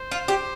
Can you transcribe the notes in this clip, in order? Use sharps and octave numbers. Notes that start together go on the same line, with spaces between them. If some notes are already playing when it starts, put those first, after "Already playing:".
Already playing: C5
F4
G4